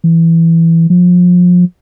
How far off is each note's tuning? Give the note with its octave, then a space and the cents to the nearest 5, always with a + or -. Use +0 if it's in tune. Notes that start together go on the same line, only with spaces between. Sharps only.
E3 +5
F3 +30